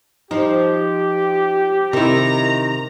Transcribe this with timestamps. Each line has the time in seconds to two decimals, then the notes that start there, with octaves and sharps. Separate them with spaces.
0.31 F3 D#4 G4
1.93 C3 D#3 E4 A#5